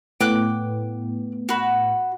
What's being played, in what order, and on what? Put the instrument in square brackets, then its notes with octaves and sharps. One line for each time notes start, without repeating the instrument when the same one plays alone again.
[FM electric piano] A2 B3 [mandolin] G5 D6 F#6
[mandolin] F#4 B5